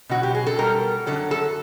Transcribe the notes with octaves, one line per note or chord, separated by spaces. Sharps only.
B2 F#3 F#4
G4
G#4
A4
B2 G3 A#4
F#2 D3 F#3 A4
A4